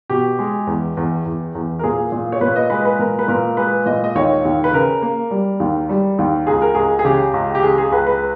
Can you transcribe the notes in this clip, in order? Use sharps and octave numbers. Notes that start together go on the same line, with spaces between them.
B2 G4
G#3
E2
E2
E2
E2
A#4
A#2 G#4
A#2
C#5
A#2 B4
D#5
G#3 B4
B4
A#2 A#4
B4
A#2 A#4
G#3 B4
A#2 D#5
D#5
D#2 C#5
D#2
B4
C#3 A#4
A#3
G3
D#2
G3
D#2
C#2 G#4
A#4
C#2 G#4
G#4
C#3 G4
C#2
G4
C#3 G#4
G#4
C#2 B4
B4